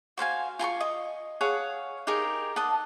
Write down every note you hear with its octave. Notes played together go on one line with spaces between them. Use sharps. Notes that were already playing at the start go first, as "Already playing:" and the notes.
F#4 C5 F5 G#5
F4 G#5 A#5 C#6
D#5
G#4 C#5 F5 F#5
D#4 G4 G#4 A#4
D#5 F#5 A5